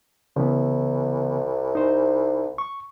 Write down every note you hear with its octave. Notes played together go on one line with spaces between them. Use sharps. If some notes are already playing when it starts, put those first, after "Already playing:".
C2 C#3 E3 B3
D#4 C5
C#6